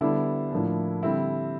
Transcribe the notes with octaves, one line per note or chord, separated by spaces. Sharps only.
D3 G3 B3 D4 E4
A2 F3 A#3 D4
D3 G3 C4 E4